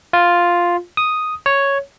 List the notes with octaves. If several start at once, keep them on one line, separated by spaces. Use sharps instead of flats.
F4
D#6
C#5